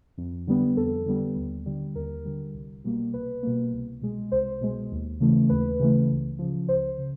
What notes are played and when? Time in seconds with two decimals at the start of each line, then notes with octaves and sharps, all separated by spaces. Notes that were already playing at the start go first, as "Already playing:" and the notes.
0.18 F2
0.47 D3 G3 B3
0.77 F2 A4
1.06 D3 G3 B3
1.36 D#2
1.66 D3 G3
1.95 D#2 A#4
2.25 D3 G3
2.54 C2
2.84 B2 G3 A#3
3.13 C2 B4
3.43 B2 G3 A#3
3.73 C2
4.02 B2 G#3
4.32 C2 C5
4.61 B2 G#3
4.91 D#2
5.20 C#3 E3 A3
5.49 D#2 B4
5.80 C#3 E3 A3
6.09 C#2
6.39 C#3 F3
6.68 C#2 C5
6.98 C#3